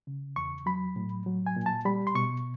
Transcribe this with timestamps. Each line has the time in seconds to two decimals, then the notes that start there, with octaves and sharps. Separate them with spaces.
0.07 C#3
0.36 E2 C#6
0.66 F#3 B5
0.96 A2
1.26 F#3
1.47 G#5
1.56 A#2
1.66 A5
1.85 G3 B5
2.07 C6
2.15 B2 C#6